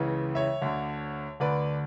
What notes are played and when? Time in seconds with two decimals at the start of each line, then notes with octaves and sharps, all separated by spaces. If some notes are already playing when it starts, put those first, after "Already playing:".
Already playing: C#2 C#3 E3
0.35 C#5 E5
0.62 D2 D3
1.40 D2 D3 B4 D5